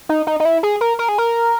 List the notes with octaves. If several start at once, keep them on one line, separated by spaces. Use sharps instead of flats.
D#4
D#4
D#4
E4
G#4
A#4
A#4
G#4
A#4